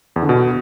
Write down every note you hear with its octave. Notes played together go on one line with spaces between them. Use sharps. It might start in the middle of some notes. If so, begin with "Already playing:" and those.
E2
D3
B2